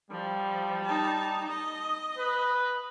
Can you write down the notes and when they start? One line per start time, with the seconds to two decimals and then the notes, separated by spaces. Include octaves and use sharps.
0.11 F3 G3
0.85 D#4 A5
1.48 D#5
2.18 B4